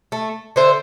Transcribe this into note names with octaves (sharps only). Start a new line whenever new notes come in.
A3
D3 C5 E5